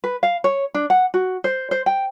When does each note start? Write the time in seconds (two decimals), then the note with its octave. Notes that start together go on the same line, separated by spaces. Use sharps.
0.04 B4
0.23 F5
0.44 C#5
0.74 D4
0.90 F#5
1.14 F#4
1.44 C5
1.71 C5
1.86 G5